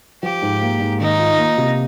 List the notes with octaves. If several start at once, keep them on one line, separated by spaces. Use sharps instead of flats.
F3 G4
G#2
A#3
G#2
D#3 D#4
F4
A#3
C3